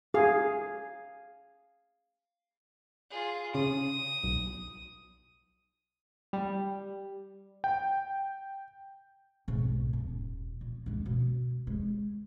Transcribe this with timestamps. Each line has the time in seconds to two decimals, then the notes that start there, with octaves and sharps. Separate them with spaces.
0.14 G#4 F5
3.11 F4 G#4
3.54 C#3 D#6
4.24 B1
6.33 G3
7.64 G5
9.48 B1 G#2
9.93 D#1
10.61 A#2
10.86 G#3 D4
11.06 B2
11.67 G#3